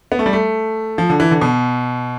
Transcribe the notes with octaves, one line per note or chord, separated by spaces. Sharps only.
B3
A3
G3
A3
F3
D3
E3
D3
B2